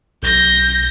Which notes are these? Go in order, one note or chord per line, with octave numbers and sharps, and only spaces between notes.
B1 G6 A#6